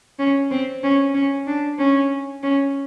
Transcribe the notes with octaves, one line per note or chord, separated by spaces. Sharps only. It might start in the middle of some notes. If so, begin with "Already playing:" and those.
C#4
C4
C#4
C#4
D4
C#4
C#4